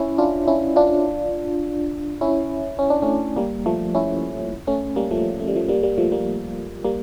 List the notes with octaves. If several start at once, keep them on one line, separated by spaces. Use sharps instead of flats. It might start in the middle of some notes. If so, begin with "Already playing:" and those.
Already playing: C#4 E4
D4 F4
C#4 E4
D4 F4
C#4 E4
C#4
D4
A3 C#4
G3 A#3
F3 A3
C#4 E4
A3 C#4
G3 A#3
F3 A3
A3
G3
F3 A3
G3 A#3
G3 A#3
F3 A3
G3 A#3
G3 A#3